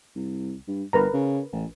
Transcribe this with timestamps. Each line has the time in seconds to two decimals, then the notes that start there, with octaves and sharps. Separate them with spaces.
0.15 C2
0.68 G2
0.93 G1 A#4 B4 A#5
1.13 C#3
1.52 A1